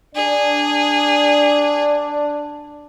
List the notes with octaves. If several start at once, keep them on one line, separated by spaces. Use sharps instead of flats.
D4 G#4 D5